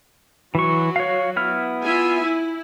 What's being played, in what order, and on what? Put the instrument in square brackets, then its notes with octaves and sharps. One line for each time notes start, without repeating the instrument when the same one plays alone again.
[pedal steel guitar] E3 C#6 [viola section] F#3 F#4
[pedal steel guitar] C#5 F5
B3 E4 F6
[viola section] F4 E5 G#5
E4